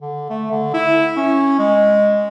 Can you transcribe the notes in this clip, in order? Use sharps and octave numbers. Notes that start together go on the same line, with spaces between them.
D3
A3
D3
E4
C#4
G#3